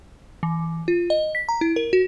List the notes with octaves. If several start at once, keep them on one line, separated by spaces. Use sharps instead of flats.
E3
F4
D#5
B6
A#5
E4
A#4
F#4